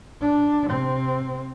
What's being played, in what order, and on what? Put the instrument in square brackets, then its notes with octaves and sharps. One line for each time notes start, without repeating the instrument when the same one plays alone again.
[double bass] D4
C3 C4